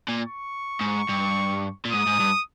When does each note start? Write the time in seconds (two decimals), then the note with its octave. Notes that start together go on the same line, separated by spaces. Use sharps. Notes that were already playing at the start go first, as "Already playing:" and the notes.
0.08 A#2
0.26 C#6
0.81 G#2
1.09 G2
1.85 A#2
1.92 G#2 D#6
2.06 G#2
2.19 G2